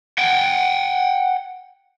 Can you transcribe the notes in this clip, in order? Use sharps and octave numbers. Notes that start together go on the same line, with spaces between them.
F#5 G5